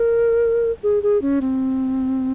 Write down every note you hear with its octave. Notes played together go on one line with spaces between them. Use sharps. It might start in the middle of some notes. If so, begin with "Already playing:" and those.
Already playing: A#4
G#4
G#4
C#4
C4